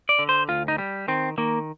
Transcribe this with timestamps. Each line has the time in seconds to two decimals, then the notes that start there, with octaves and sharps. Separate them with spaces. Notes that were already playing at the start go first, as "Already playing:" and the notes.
0.09 D5
0.19 D3
0.29 C5
0.48 D2 F4
0.68 D#4
0.78 G3
1.08 D#3 C4
1.38 D#3 A#3